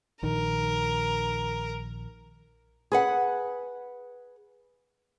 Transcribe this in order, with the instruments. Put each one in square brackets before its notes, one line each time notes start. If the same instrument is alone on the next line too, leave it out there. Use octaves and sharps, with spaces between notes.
[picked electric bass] A#1 D#3 [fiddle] A#4
[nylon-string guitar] G#4 B4 F#5